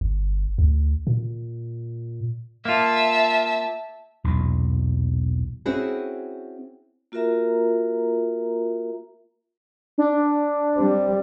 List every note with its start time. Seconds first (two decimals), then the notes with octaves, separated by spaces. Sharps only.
0.01 G1
0.58 D2
1.07 A#2
2.65 A#3 F4 E5 A5
4.24 B1 E2 A#2
5.66 C4 C#4 E4 F#4 G#4
7.12 A#3 F4 F#4 A#4 E5 A#5
9.98 D4
10.76 G3 C4